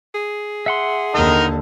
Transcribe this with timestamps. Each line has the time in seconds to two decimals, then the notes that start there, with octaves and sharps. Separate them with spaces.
0.15 G#4
0.66 E5 F#5 C6
1.15 D#2 D3 D#4 A#4 D#5